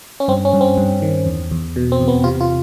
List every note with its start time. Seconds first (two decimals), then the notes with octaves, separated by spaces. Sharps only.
0.20 C#4
0.28 G2 C4
0.45 C#4
0.54 G2
0.61 C4
0.78 G2
1.02 D#3
1.26 E2
1.51 E2
1.76 B2
1.92 C4
2.00 E2
2.08 B3
2.24 C3 F4
2.40 F4